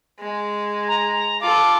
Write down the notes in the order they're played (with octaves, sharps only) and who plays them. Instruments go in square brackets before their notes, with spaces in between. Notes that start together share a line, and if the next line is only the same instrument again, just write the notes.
[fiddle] G#3
[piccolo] A#5
[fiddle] F4 A4 [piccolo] D6